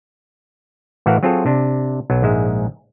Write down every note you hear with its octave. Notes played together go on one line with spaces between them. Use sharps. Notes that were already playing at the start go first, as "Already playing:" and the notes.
A2 E3 F#4 A#4 F5 F#5
F#3 C4 F4 G#4 A4 C#5
C3 D4
B1 F#3
A#1 G#2 G#3 E5